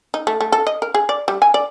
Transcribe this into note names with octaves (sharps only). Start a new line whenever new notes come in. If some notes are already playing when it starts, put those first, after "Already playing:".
D#4
A3
A3
A4
D#5
A#4
G#4
D5
G3
G#5
D5